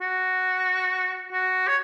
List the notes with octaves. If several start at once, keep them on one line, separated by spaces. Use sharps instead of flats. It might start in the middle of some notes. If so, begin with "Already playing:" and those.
F#4
F#4
C#5